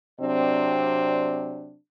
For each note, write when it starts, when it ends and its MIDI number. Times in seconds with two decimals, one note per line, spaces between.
0.20 1.75 48
0.20 1.75 54
0.20 1.75 60
0.20 1.75 62
0.20 1.75 74